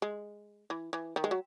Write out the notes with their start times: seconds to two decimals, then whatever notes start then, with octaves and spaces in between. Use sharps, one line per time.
0.02 G#3
0.70 E3
0.93 E3
1.16 D#3
1.24 G#3
1.31 F#3